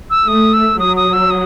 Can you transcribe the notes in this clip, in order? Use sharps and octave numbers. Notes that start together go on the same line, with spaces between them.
E6
A3 D#6
E6
F#3 D#6
D#6
E6
D#6